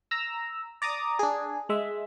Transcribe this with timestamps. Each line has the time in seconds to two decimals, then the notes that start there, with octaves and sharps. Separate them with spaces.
0.11 A#5 E6
0.82 D5 A#5 D6 D#6
1.19 D4 G#4
1.69 G#3 E5